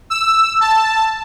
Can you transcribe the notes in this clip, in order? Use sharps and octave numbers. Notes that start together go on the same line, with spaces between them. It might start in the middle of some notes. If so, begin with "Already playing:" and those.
E6
A5